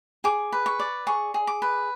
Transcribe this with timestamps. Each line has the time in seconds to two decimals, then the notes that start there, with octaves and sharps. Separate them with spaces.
0.24 G#4 D6
0.52 B4
0.66 C#6
0.79 D5
1.07 G#4 C#6
1.34 G#4
1.47 D6
1.62 B4